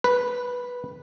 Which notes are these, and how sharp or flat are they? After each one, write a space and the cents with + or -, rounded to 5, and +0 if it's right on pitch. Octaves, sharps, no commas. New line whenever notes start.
B4 -10